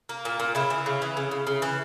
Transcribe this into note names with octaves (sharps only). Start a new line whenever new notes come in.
A#3
A#2
A#2
C#3 E4
E3
C#3
E3
C#3
C#3
C#3
E3